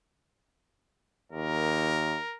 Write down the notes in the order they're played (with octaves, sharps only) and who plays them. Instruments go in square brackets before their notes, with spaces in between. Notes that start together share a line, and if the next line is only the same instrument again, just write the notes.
[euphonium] D#2 [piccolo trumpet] A#4